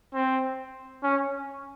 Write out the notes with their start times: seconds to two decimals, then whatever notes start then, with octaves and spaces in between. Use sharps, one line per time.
0.14 C4
1.03 C#4